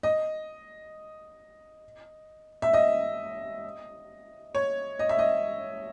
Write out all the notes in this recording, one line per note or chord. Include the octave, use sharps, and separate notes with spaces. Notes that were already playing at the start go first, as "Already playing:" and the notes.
D#5
E5
D#5
C#5
D#5
E5
D#5